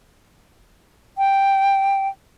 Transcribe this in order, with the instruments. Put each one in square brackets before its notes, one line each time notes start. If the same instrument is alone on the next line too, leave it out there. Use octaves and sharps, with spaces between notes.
[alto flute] G5